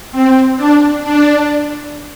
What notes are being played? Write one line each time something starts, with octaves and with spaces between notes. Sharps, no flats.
C4
D4
D4